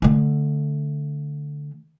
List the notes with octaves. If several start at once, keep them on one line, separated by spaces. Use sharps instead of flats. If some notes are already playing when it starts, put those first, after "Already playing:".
D3 A3